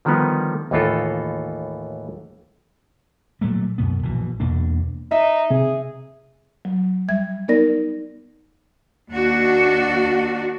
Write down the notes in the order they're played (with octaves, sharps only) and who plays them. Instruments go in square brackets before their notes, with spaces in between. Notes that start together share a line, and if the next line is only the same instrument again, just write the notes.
[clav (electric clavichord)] D3 D#3 F3 G3 B3 D#4
D#2 A2 E3 D#4 F4 A4
[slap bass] A#2 F#3 G3 A3
F#2 B2 B3
A#1 B2 E3
E2 B2 A#3 D4
[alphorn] D#4 [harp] E5
[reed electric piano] C3 [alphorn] G#4
[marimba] F#3
G3 E5 G#6
B3 D#4 A#4 D5 A#6
[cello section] D#2 D4 F#4